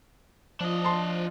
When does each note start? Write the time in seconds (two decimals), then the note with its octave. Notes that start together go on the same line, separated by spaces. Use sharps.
0.60 F3 D4 D#5
0.84 A5 C6